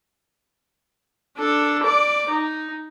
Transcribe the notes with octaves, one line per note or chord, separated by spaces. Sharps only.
D4 A4
D5 D6
D#4